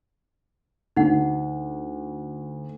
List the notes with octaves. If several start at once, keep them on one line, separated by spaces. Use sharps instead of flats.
D2 D#4 F#5